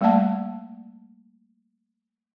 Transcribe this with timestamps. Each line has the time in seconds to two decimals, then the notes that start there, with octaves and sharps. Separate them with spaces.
0.01 G3 A3 A#3 D5 F#5 A5